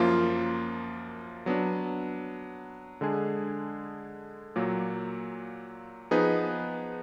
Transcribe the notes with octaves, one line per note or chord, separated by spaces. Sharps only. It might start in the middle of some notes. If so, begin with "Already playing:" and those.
Already playing: F#2 F3 A#3 F4
F#3 B3 D4
D3 G#3 D4 G#4
A#2 F#3 A#3
F3 B3 D#4 G#4 B4